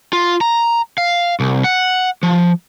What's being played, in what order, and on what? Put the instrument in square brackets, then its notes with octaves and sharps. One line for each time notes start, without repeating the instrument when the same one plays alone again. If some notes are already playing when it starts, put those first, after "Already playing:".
[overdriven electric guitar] F4
A#5
F5
C2
F#5
F3